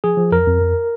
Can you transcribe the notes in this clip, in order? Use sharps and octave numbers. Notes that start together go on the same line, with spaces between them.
F3 G#4
F3
F2 A#4
F2
F2